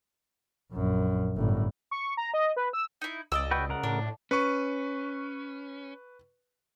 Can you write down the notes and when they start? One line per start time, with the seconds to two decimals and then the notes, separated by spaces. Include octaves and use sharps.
0.72 A#1 F#2
1.37 G1 A2
1.91 C#6
2.17 A#5
2.34 D#5
2.56 B4
2.73 E6
3.01 D#4 E4
3.32 C#2 D5 D#5 E6
3.51 F#4 B4 G5
3.69 C#3 A#4 F#5
3.83 A2 D4
4.31 C#4 B4 C#6